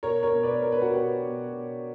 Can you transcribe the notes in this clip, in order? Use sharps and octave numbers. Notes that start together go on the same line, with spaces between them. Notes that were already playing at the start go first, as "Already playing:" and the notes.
B2 A#4 C#5
A#4 C#5
B2
B4 D5
B2 A#4
B4
F#4 A#4
B2 G4 B4
B2
B2